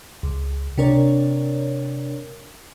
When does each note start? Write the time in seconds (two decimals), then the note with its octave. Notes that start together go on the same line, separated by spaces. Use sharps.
0.23 C#2
0.78 C3 D4 A#4 C#5 D5